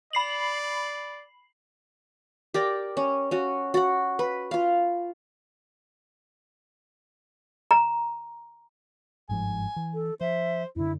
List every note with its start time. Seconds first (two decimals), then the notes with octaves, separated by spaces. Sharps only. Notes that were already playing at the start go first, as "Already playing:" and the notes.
0.13 D5 B5 C7 F#7
2.54 G4 A#4 D5
2.97 C#4
3.31 C#4 F#4
3.74 F#4 F#5
4.19 B4
4.51 F4 F5
7.71 A#5
9.29 G1 G#2 F3 G#5
9.76 E3
9.94 A4
10.21 F3 C5 E5
10.76 F#2 D3 E4